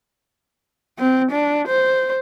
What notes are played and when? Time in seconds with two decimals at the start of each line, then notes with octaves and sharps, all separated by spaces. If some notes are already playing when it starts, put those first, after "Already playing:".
0.98 C4
1.31 D4
1.67 C5